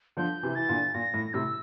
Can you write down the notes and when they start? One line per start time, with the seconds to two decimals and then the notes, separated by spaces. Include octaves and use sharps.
0.17 D3 F3 G6
0.43 C3 E3
0.55 E3 A6
0.69 A#2 D3
0.94 A#2 A#6
1.14 A2
1.34 A2 C3 E6